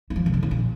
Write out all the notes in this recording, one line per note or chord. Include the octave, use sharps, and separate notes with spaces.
E3
F3
C3
D3
A2
A#2